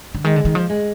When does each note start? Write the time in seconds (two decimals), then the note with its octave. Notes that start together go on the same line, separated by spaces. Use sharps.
0.15 D3
0.24 D#3 G#3
0.36 D3
0.45 D#3
0.55 F3
0.70 G#3